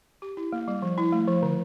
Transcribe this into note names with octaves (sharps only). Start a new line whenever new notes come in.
G4
E4
A#3
G3
F3
E4
A3
F3
D3